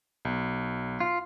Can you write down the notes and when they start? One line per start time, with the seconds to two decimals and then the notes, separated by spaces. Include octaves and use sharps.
0.25 B1
1.00 F4